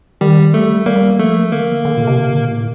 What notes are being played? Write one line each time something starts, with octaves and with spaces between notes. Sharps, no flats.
D#3 G3
G3 A3
G3 A#3
F3 A3
D3 A#3
D3
A#2
C3
D3
A#2
A2